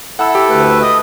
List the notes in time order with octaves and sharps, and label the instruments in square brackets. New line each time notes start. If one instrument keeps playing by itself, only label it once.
[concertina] E4 A4 [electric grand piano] F#5 E6
[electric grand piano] G4
[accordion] D2 A3 B4
[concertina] D#5 D#6